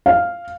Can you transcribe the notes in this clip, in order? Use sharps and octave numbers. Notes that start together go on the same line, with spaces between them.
F5